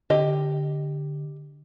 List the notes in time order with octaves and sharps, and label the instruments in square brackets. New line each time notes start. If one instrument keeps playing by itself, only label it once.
[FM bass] D3 [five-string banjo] G4 D#5